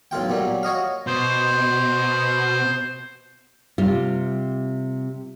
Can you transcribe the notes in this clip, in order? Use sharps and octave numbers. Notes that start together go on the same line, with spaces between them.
B1 A2 F4 G5
A#2 F#3 G3
F#4 C#5 D#5 F5
B2 C5
C3 G3 F4